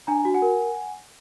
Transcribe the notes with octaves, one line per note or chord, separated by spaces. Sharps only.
D4 G#5 A#5
F#4
F#5 G#5
A#4